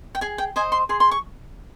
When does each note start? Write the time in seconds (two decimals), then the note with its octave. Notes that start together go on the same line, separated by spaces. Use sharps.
0.15 G5
0.21 G#4 G#5
0.38 G5
0.56 C5 D#5 G#5
0.72 C6
0.89 G#4 C6
1.00 C6
1.11 C#6